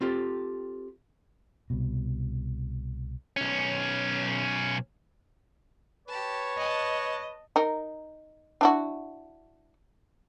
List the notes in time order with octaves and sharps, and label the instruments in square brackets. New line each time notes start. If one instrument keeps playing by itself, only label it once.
[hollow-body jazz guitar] C4 F4 G4 A4
[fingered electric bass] C2 B2
[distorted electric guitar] B1 C#4
[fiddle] G4 A5 [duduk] B4 [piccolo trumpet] C#5
[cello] D#5 [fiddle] F#5 A5
[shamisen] D#4 A#4
D4 E4 F#4